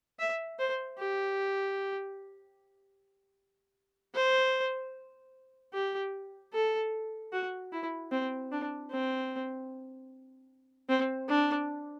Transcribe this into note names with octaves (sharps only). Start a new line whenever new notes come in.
E5
C5
G4
C5
G4
A4
F#4
E4
C4
D4
C4
C4
D4